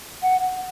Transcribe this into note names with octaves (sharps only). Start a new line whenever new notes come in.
F#5